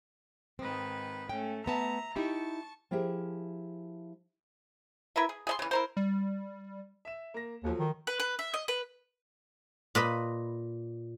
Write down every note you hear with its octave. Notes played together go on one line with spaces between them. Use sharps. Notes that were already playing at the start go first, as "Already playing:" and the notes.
G#2 D#3 C4 B4
A3 C#4 G5
A3 B3 E5 A5 A#5
D#4 E4 G4 A5 C#6
F3 E4 G4 G#4 A#4 E5
E4 A#4 B4 E5
G#4
G#4 D#5 C6
C#3 E3
E4 A#4 C5
G3
E5 E7
A#3 A#6
D#2 F3 F#3 A4
D#3
B4
B4
E5
D#5
B4
A#2 B4 D#5 B5